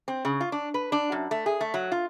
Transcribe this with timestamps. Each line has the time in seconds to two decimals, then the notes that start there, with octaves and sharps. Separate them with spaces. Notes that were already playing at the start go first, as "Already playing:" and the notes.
0.08 C4
0.25 C#3
0.41 F4
0.52 D4
0.74 B4
0.92 D4
1.12 F#2
1.31 A3
1.46 G#4
1.61 A3
1.74 F#3
1.92 F4